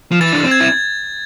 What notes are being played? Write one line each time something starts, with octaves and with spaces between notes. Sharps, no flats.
F3
E3 A6
D4
C4
G#6
E4